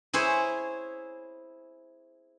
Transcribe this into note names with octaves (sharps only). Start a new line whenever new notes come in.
E4 G#4 C5 C#5